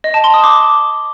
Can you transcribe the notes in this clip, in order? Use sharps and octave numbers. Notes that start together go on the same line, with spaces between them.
D#5
A5
C6
D#6
D6